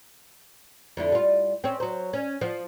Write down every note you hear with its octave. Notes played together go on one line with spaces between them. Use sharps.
F2 D3 E4
G3 F4
C4 C#4
F#3 C5
C#4
F3